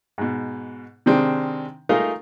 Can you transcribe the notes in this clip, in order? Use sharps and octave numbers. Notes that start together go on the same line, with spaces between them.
G#2 B2
C3 D#3 G#3 C4 D4
A3 D#4 F4 G#4 A#4